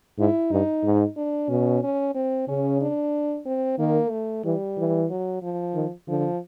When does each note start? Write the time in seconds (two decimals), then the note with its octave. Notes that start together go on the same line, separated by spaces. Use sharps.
0.18 G#2 E4
0.51 G2 D#4
0.84 G#2
1.17 D4
1.49 B2 C#4
1.83 C#4
2.15 C4
2.48 C#3 C#4
2.81 D4
3.45 C4
3.79 D#3 A#3
4.11 A3
4.44 E3 G3
4.77 E3
5.10 F#3
5.42 F3
5.75 D#3
6.08 D3 F3